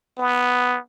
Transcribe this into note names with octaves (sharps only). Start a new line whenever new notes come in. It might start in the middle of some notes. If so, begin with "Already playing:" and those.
B3